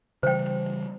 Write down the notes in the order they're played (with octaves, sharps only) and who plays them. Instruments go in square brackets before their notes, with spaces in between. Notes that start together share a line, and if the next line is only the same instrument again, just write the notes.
[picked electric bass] C#3 E3 G3 [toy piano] C5 G5